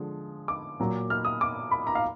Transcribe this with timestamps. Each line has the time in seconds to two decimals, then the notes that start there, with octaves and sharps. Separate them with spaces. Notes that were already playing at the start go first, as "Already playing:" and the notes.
Already playing: D3 F3 G#3
0.48 D6
0.80 A#2 F#3
1.10 F6
1.25 D#6
1.41 D6
1.71 B5
1.87 A#5
1.95 F5